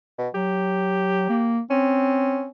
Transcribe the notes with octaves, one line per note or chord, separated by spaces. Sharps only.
B2
F#3 G4
A#3
C4 C#4